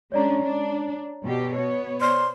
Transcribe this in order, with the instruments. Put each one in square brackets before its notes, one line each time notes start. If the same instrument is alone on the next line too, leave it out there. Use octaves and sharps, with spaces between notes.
[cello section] G#3 C#4 D4 [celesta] C#5 D5 A#5
[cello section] D4
B2 G4
B3 C#5
[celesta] C5 D5 F6 [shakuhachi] C6